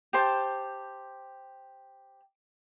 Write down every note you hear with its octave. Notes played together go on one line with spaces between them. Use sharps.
G4 C5 A5